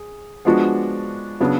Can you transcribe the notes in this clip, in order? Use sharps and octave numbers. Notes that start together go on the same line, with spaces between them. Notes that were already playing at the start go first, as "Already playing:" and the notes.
Already playing: G#4
F3 G#3 B3 D4 F#4
C#3 F#3 B3 D4